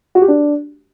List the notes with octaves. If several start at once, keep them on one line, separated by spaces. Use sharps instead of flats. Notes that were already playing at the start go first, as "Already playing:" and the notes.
F#4
G4
D4